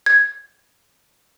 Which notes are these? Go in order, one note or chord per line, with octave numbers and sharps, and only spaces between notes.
G#6